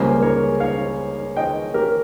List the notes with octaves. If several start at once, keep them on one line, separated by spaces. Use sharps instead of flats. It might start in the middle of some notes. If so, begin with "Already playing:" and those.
Already playing: C#2 C#3 G3 A#3 C#4 G#4 C5
A#4 C#5
C#5 F5
D#5 G5
G4 A#4